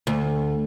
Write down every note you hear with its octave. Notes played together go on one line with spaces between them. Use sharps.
D2